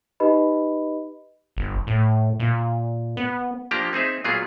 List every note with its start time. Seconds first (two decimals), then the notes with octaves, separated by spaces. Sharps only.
0.20 D#4 G4 B4 D#5 B5
1.57 G1
1.87 A2
2.40 A#2
3.17 B3
3.71 F3 A#3 D4 G4 A#5
3.93 C4 D#4 G#4 E5
4.24 A#2 F#3 A#3 B3 F4 G#4